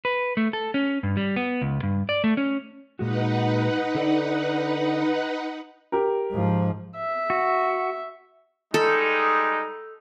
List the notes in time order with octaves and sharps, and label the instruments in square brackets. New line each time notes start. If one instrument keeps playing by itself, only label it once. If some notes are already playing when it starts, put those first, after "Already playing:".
[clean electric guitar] B4
A3
A4
C#4
G2
G3
B3
C#2
G2
D5
A3
C#4
[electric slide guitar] A#2 G#3 F#4 [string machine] D#4 B4 F#5
[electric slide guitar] D3 A4 D5
[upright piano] G4 A#4
[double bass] G#2 F3
[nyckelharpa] E5
[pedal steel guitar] F#4
[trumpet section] G3 G#3 D#4 [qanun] A4